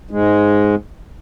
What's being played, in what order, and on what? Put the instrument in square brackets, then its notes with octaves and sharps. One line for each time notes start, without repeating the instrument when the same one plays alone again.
[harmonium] G#2 G#3